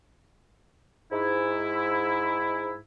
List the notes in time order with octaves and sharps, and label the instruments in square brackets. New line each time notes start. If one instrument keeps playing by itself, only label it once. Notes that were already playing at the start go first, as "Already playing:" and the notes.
[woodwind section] G#2 E4